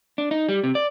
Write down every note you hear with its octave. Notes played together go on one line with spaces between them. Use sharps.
D4
D#4
G3
C3
D5